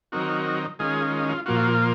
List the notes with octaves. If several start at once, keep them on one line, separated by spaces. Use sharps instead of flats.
D#3 F#3 C4 D#4 F#4 A#4
D#3 G#3 C#4 F4 G#4
F4
A#2 F3 A#3 F4 F#4